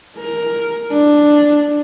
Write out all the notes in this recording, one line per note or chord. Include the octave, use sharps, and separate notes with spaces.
A#4
D4